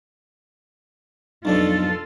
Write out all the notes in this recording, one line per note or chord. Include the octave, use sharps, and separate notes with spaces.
B1 F2 B2 D4 D#4 F4 A4